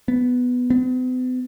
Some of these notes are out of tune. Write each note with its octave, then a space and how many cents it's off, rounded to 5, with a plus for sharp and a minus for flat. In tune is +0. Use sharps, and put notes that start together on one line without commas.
B3 +5
B3 +45